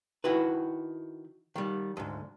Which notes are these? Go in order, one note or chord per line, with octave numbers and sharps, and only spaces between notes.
D#3 E4 F#4 B4
D#3 G3
D2 G#2